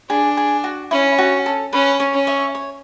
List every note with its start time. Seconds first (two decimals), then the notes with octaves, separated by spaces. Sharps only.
0.09 D4 G#4
0.37 G#4
0.64 F#4
0.91 C#4 E4
1.18 F#4
1.46 A4
1.72 C#4 B4
2.00 C#5
2.13 C#4
2.27 C#5 E5
2.55 C#5